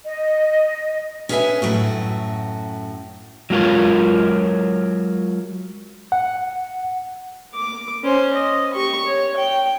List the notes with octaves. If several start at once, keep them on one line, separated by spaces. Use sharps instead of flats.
D#5
C#4 G#4 B4 D5 E5 G#5
F#2 A2 F#4
F#3 G#3 F4 A#4 C#5
F#5
D6
C#4 C5
D#5
G4 C#6
C#5
G5